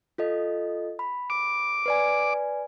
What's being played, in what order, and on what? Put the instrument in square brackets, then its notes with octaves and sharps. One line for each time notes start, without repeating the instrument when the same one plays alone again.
[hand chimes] F4 A4 D#5
B5
[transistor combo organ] D6
[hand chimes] B4 D5 G#5